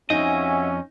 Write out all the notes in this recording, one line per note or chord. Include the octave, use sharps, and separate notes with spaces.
F2 C#4 D#4 F#4 D#5 E5 G#5